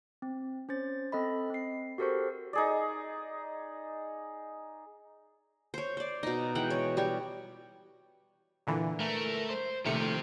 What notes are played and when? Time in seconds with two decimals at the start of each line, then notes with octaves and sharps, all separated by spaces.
0.22 C4
0.69 C#4 C5 A6
1.12 C4 A4 D#5 B5
1.50 C4 C7
1.98 F#4 G4 A4 A#4 C5 C#6
2.53 D#4 G#4 D5
5.74 C5 C#5
5.97 C5 D5
6.23 B2 D#4
6.55 E3 G#3 F#5 G5
6.70 C#5
6.97 G3 G4 C#5
8.67 A#2 D3 E3
9.00 A3 A#4
9.50 C5
9.85 A#1 D#3 F3 A3 G4 C5 C#7